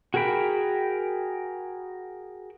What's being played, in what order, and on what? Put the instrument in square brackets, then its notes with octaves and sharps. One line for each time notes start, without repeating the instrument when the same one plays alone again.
[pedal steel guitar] F#4 G#4 A#4 G5 B5